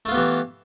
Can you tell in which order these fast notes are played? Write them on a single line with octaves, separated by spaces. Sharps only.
A3 F4 B3 G4 E3